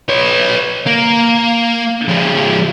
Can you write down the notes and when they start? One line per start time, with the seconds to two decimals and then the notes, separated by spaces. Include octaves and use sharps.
0.09 B4 C#5
0.86 A#3
2.08 F3 G#3